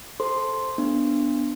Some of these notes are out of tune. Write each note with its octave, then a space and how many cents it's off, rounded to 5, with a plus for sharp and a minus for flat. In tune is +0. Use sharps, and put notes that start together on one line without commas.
A4 +0 C5 +0 C6 +0
B3 +0 D4 +0